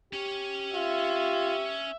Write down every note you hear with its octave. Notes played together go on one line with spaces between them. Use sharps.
C#4 G4 C#5
F4 E5